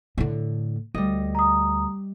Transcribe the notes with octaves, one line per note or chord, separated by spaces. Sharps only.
A2 D3
D2 G3 D#5
A#5 D#6